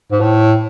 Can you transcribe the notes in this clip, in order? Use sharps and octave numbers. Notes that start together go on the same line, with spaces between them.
G#2
A2